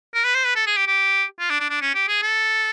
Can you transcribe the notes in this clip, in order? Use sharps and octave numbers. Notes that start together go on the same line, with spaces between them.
A#4
B4
C5
B4
A4
G#4
G4
G4
F4
D4
D4
D4
C#4
G4
G#4
A4